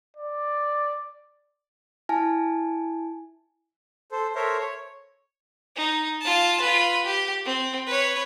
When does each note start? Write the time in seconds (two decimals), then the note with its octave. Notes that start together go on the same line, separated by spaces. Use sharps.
0.17 D5
2.09 E4 G#5 A5
4.12 A4 C5
4.35 A4 A#4 C5 C#5 E5
4.58 C#5
5.76 D#4
6.21 F4 A5
6.61 F4 B4
7.05 G4
7.45 C4
7.87 B4 C#5